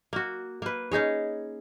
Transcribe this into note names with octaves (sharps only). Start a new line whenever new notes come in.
A#3 F#4
A#3 B4
C#4 D#4 G#4 C#5